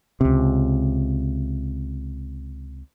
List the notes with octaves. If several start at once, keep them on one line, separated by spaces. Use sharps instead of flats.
C#2 C3